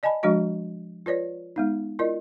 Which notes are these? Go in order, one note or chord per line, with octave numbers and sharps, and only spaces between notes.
D5 D#5 G#5 A5 B5
F3 G#3 D4 F#4 D#5
F4 B4 C#5 D5
G#3 B3 D#4
E4 F4 A#4 D5 D#5